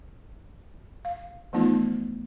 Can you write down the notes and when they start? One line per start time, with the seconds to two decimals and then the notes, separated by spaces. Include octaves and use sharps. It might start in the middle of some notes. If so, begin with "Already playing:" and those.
1.05 F5
1.53 E3 F3 A3 B3 D#4 F4